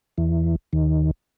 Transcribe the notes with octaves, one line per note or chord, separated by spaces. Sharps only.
E2 E3
D#2 D#3